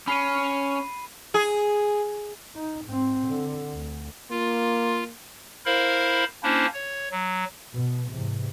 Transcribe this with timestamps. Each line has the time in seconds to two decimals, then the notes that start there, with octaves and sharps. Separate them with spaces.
0.07 C#4 B5 C7 D#7
1.34 G#4
2.55 D#4
2.85 G#2 C4
3.27 D3
3.73 D2
4.31 A#3 F4
5.66 E4 A#4 C5 F5 B5
6.43 A#3 C#4 D4 E4 C5
6.74 C#5
7.11 F#3
7.74 B2
8.11 E2 G#2 C3